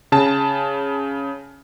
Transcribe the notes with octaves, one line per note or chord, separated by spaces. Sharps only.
C#3 A5